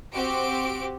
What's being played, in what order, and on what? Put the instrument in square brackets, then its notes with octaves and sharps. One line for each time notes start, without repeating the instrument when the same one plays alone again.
[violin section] C4 F#4 G4 D7